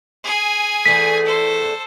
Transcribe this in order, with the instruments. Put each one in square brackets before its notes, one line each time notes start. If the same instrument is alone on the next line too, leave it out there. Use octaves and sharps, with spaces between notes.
[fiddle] G#4 G#5
[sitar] E2 A3 [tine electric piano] B6
[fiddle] A4 C5